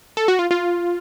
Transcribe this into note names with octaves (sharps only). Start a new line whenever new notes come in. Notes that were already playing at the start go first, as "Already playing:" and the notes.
A4
F#4
F4
F4